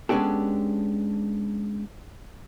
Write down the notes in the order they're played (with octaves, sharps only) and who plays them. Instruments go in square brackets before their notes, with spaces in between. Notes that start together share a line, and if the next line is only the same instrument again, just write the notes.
[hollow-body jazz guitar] G#3 B3 C#4 D4 G4 A4